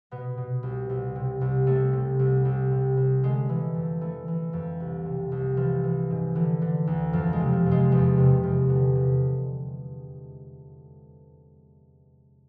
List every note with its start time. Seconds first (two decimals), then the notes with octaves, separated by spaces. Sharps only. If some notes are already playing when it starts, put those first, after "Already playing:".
0.11 B2 B3
0.38 B2
0.63 C2
0.89 C2
1.15 C3
1.41 C2
1.67 C2 A3
1.93 C3
2.19 C2
2.45 C2
2.71 C3
2.97 C2
3.23 D3 G#3
3.49 D3 E3
3.75 F2
4.01 E3 A3
4.28 E3
4.53 F2
4.80 C2
5.05 C3
5.32 C2
5.57 E3 F3
5.84 E3
6.10 G#2
6.35 D3 E3
6.62 D3
6.87 D2
7.13 F2 F3
7.33 G#3
7.40 C3
7.52 F3
7.66 F2
7.71 G#3
7.92 E2 F3
8.18 C3
8.43 E2
8.69 D3
8.95 D3